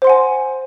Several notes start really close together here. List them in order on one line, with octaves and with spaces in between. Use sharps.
C5 C6 F#5 G#5